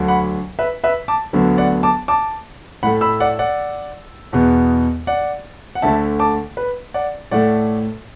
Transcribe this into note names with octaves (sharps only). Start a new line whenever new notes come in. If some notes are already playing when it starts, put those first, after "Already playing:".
Already playing: D2 D3 F#3
F#5 B5
B4 E5
B4 E5
A5 D6
D2 D3 F#3 B3
D5 F#5
A5 D6
A5 D6
A2 A3 F#5 B5
B5 E6
D5 F#5
D5 F#5
E2 B2 B3
D5 F#5
F#5
D2 D3 A3 E5 A5
A5 D6
B4
D5 F#5
A2 A3 D5 F#5